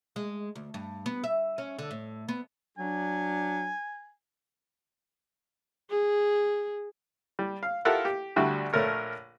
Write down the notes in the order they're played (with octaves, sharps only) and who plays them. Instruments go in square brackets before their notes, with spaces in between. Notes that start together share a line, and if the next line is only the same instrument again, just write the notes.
[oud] G#3
D2
G2
B3
E5
C#4
D3
A2
B3
[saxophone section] F#3 D4 [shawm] G#5
[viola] G#4
[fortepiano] G3
F5
E4 F4 G4 A4 A#4 F#5
G4
D2 G3 D4 F#4 G4 E5
A#1 A3 A#4 C#5